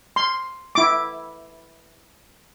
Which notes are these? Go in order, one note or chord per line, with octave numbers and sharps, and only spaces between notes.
C6
E4 D6